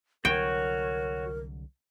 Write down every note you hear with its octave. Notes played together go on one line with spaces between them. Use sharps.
C2 D3 F#3 F#4 A#4 C#5 G5